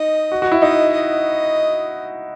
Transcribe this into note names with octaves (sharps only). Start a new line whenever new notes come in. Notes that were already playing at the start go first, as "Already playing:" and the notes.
Already playing: D#4 D#5
F#4
F#4
E4
D#4 D#5
D#5